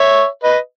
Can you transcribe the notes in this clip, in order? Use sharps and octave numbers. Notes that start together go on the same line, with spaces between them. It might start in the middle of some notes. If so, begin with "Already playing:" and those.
Already playing: C#5 E5
B4 D#5